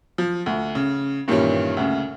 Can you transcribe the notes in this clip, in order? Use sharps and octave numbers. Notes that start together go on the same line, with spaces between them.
F3
D2
C#3
G2 A#2 D#3 E3 G3 C#4
D2 C#3